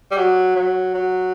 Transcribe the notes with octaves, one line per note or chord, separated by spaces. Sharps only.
G3
F#3
F#3
F#3